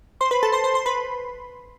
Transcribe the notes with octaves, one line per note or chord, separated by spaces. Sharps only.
C5 C6
B4 B5
A4 A5
C5 C6
C5 C6
C5 C6
B4 B5